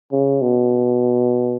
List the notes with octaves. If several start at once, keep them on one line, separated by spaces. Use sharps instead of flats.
C#3
B2